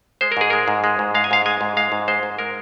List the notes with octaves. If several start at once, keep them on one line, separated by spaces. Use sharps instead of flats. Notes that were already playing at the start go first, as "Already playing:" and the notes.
G#3 C5
A#4
G#2 G#4
G#3 A#4
G#2
G#3
G#2
G#3 F5
G#5
G#2 F5
G#3 G#5
G#2
G#3 F5
G#2
G#3 C5
G#2
G#3 A#4